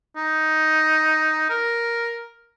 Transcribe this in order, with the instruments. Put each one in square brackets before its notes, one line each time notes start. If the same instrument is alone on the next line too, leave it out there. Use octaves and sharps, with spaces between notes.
[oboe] D#4
A#4